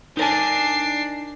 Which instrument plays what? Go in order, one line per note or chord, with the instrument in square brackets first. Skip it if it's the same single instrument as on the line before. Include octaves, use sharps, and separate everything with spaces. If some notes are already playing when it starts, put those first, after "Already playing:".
[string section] D4 C7 [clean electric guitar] D#4 A#4 G#5